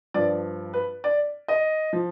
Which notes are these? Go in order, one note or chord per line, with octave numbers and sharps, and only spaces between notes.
G2 F3 D5
B4
D5
D#5
F3